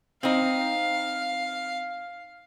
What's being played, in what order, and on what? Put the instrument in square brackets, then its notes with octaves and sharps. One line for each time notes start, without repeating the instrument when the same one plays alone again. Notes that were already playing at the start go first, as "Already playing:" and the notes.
[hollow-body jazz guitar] C4 D#4 [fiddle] F5